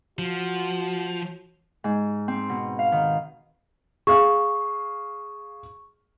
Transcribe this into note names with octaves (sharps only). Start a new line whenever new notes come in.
F3 F#4
G#2
C4
B2
F5
D#3
G#4 F5 C#6